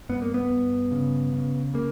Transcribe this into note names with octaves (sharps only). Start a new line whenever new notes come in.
G2 B3
A#3
B3
G2
C#3
C#3
C#3 A#3